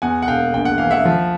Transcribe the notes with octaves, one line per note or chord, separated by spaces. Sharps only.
E2 F#5 G#5
F#5
E1 F5 G5
A#1 G5
F#5
E3 F5
E5 F#5
F3